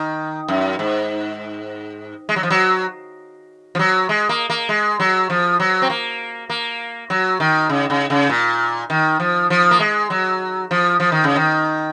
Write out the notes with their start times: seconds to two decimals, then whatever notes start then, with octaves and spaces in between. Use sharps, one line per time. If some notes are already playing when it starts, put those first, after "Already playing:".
Already playing: D#3
0.48 F#2
0.79 G#2
2.29 G#3
2.36 F#3
2.43 F3
2.50 F#3
3.75 F3
3.79 F#3
4.09 G#3
4.29 A#3
4.50 A#3
4.69 G#3
5.00 F#3
5.30 F3
5.60 F#3
5.82 C4
5.90 A#3
6.50 A#3
7.10 F#3
7.40 D#3
7.69 C#3
7.90 C#3
8.10 C#3
8.30 A#2
8.90 D#3
9.20 F3
9.50 F3
9.71 A#3
9.80 G#3
10.10 F#3
10.71 F3
11.00 F3
11.12 D#3
11.24 C#3
11.36 D#3